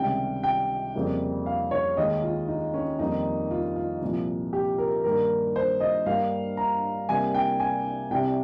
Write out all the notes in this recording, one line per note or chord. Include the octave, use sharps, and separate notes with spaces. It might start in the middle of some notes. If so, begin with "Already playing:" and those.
Already playing: C#2 C3 D#3 G3 G5
G5
F2 C#3 G3 A#3
F5
C#5
D#2 D#3 G#3 D#5
F4
D#4
C#4
F2 D#3 G3 A#3 D#4
F4
F4
C2 A#2 F3
G4
A#4
G2 D#3 A#3 A#4
C5
D#5
G2 G3 A#3 F5
A#5
C2 C3 G3 A#3 G#5
G5
G#5
C2 C3 G3 G5